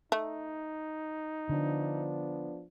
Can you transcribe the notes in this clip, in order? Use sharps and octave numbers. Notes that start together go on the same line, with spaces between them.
A3 D#4
D3 F3 B3 D4